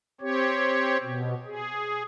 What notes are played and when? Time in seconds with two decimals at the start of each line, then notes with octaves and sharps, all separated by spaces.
0.21 C4 G4 C#5
1.03 B2
1.45 G#4